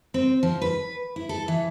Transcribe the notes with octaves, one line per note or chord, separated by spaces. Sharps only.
C4
F3
B4
E4
A4
E3